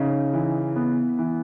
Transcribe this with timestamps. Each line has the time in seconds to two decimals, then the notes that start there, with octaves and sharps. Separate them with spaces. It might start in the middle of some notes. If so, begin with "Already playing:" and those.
Already playing: C#3 D#4
0.33 E3
0.76 B3
1.19 E3